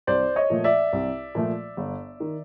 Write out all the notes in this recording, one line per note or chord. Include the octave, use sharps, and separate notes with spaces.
C2 C5 D5
C#5 D#5
A#2 F3 A3
D5 E5
C2
A#2 F3 A3
G1
D#3